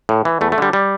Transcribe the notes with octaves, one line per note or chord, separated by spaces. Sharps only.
A2
E3
E2 A3
A3
D3 G3
G3